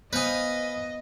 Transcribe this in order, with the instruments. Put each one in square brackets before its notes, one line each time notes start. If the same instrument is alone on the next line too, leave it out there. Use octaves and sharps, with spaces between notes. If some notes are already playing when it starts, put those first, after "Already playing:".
[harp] B3 F5 [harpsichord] B4 G#5 [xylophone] C5 D#6 [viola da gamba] D#5